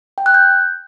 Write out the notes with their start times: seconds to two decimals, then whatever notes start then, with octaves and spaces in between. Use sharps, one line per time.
0.18 G5
0.26 F#6
0.34 G6